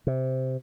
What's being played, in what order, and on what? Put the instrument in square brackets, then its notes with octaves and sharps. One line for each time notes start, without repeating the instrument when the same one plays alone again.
[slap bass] C3